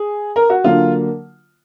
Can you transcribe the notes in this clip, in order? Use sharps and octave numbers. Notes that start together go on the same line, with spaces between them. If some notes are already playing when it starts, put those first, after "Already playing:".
Already playing: G#4
A#4
F#4
D3 F#3 A#3 F4